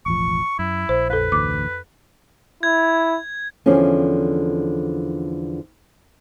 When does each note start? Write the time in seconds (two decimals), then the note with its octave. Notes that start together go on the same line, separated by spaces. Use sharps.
0.06 E1 A1 F3 C#6
0.59 F#2 E4
0.89 A#1 C5
1.10 F2 A4 B4
1.32 A1 D2 D6
2.63 E4 G#6
3.66 E2 D3 F3 C#4